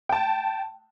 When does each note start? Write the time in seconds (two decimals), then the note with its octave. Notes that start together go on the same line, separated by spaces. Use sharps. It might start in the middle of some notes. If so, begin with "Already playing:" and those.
0.09 G5 A5